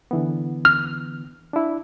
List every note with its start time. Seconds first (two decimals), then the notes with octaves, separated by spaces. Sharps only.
0.11 D3 E3 B3
0.65 F6
1.53 D4 E4